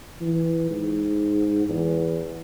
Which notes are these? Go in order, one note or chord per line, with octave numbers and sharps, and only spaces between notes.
E3
G#2
E2